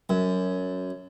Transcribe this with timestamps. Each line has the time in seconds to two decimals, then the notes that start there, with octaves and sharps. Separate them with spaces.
0.09 F#2